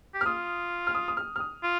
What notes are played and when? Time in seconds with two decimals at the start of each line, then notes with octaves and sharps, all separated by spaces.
0.14 G4
0.21 F6
0.26 F4 D#6
0.87 F6
0.95 D#6
1.08 D#6
1.17 F6
1.36 F6
1.40 D#6
1.64 F4